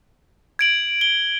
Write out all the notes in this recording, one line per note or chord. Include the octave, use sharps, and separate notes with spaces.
G#6 D7 F#7
G7